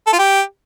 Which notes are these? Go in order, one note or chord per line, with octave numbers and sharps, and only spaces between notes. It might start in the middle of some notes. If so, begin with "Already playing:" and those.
A4
F4
G4